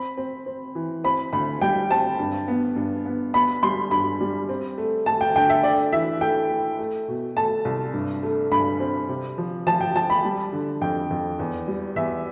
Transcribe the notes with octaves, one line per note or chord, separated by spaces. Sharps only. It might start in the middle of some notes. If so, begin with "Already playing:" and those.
Already playing: C4 B5
C4
C4
E3
C4 B5
D2 B5
G3 G5
C4 A5
G2
B3
G2
B3
B3 B5
G3 C6
G2 B5
G3
C4
A3
A3 A5
G5
D3 G5
E5
A3 D5
E3 E5
A3 G5
A3
A3
B2
A3 A5
C2
G2
A3
G2 B5
C4
C3
F3
F3 A5
G5
F3 A5
B5
G3
D3
F2 G5
F2
E2
G3
E2 E5